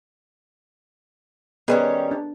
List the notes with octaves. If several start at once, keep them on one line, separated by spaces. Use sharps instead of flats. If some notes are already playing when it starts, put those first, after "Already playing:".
D#3 G3 B3 C#4 G#4 B4
D4